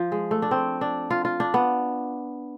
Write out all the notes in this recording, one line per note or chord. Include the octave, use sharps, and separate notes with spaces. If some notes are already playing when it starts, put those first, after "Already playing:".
Already playing: F3
G#3
A3
D4
C4
D4
F4
F4
D4
B3